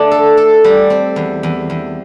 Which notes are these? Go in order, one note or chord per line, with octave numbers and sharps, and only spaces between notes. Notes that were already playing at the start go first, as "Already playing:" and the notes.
Already playing: A3 D4
A4
A4
G3
C4
E2
E2
E2